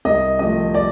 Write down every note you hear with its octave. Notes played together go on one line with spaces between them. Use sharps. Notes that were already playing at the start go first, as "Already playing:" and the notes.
C2 D#5
C3 F3 A3 D#5
D5